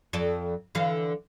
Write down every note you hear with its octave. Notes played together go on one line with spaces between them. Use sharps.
F2 A4 D5
D3 E3 F5